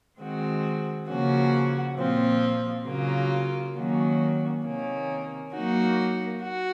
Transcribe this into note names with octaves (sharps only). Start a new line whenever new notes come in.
D#3 G#3 C4 F#4
C#3 F3 A#3 C#4 F#4
A#2 F3 C4
C#3 F#3 A#3 F4
D#3 F#3 A#3 C#4 F#4
C3 D#3 A#3 C#4
F#3 A#3 D#4 F#4
F#4